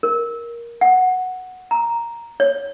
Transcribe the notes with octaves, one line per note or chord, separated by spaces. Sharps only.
A#4
F#5
A#5
C#5